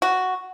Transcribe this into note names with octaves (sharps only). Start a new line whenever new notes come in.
F#4